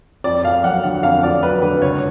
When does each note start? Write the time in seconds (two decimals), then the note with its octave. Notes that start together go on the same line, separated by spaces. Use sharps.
0.24 F2 D5
0.45 F2 F5
0.64 F#3 F#5
0.84 D3 F#5
1.03 F2 F5
1.23 F2 D5
1.43 F#3 B4
1.62 D3 B4
1.81 C#2 C#5